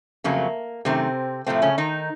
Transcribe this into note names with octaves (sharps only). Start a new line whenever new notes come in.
F2 C#3 F#3 A3 A#3
F#2 C3 D#3 A3 C4
A2 C3 F3 A3 C4
C#3 C#4
D#3 D#4